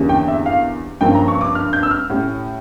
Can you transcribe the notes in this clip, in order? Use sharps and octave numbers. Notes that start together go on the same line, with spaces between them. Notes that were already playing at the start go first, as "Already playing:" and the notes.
Already playing: E2 D3 G3 A#3 C#4
G5
E5
F5
G2 F3 A#3 C#4 G5
A#5
C#6
D6
F6
G6
E6
F6
A2 G3 C#4